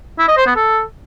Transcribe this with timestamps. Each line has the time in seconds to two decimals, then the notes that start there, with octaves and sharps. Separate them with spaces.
0.19 E4
0.28 D#5
0.37 C5
0.46 B3
0.56 A4